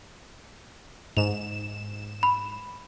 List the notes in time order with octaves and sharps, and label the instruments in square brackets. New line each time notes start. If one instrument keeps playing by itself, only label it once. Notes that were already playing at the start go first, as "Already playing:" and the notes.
[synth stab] G#2 E7 [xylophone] F7
[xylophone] B5